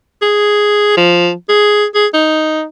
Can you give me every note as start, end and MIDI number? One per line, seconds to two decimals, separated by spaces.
0.22 0.94 68
0.97 1.32 53
1.49 1.85 68
1.94 2.07 68
2.14 2.64 63